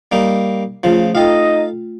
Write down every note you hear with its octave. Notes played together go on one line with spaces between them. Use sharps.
G3 A#3 D#4
C#3 F3 A3 F4
D#4 F4 A4 D#5 F5 G5